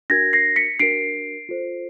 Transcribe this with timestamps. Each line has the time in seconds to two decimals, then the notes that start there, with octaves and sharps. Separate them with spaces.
0.10 D4 F#4 A#4 G#6 A#6
0.33 A#6 C7
0.56 B6 C#7
0.80 D4 F#4 A#4 C7 D7
1.49 F4 A4 C5